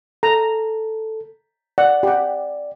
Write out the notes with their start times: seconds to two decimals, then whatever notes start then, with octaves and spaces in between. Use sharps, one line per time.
0.23 A4 A#5
1.78 D5 F#5
2.03 G4 F#5